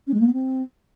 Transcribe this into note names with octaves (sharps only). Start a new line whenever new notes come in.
C#4
G#3
A#3
B3
C4